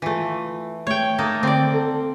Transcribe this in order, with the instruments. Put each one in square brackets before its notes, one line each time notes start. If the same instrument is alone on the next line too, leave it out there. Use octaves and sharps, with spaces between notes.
[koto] E3 A3 [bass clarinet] F4
[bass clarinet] A3 [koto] C#5 G5
[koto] A#3 D#4 A4
[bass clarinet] D3 [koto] C4 D5
[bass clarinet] A4